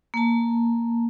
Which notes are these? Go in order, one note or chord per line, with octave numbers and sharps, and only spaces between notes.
A#3 A5